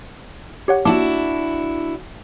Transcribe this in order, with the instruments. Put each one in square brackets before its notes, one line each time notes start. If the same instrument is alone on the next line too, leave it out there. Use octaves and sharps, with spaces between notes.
[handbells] G4 C#5 F#5
[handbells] A#3 A5 D6 [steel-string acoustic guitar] D4 E4 F#4